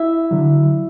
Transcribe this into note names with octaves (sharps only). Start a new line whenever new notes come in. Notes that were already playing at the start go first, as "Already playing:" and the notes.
Already playing: E4 E5
D3 F#3